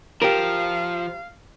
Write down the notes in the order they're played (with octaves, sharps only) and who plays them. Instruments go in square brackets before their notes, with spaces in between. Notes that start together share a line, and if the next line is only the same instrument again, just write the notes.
[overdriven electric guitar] F3 [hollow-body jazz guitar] G4 A#4 [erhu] F5